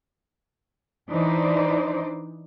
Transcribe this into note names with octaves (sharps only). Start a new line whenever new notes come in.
E3 D4 D#4 C5 D5